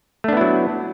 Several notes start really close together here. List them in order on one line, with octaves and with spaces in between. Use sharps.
A3 D4 B3 E4 F#3